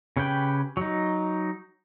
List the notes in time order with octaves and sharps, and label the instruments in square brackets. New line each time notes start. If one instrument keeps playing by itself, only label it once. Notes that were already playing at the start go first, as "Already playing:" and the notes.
[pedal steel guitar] C#3 C#4 G4 B4 G5
F#3 D#4